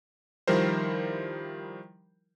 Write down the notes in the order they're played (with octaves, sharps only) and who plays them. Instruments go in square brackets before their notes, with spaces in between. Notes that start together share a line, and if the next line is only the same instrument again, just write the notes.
[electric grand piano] D#3 F3 G3 E4 A#4 C5